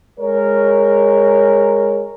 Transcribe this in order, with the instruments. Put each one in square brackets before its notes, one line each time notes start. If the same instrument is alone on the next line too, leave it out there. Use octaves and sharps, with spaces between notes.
[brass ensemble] G#3 A#4 C#5